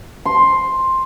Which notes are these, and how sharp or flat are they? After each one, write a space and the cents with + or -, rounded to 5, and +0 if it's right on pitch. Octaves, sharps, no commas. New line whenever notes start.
C6 +5